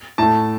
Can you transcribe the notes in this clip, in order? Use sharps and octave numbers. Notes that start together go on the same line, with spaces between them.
A2 A3 A5